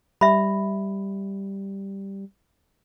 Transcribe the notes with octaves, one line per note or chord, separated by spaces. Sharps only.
G3 E5 B5